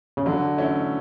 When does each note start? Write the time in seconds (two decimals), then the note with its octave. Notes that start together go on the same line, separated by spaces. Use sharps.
0.17 C#3
0.26 D3 F#3
0.57 A3 C#4 E4